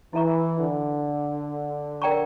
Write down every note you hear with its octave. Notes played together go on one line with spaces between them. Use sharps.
E3 E4 A4 E5 A#5 C#6
D3
A#4 D5 G5 A#5 C#6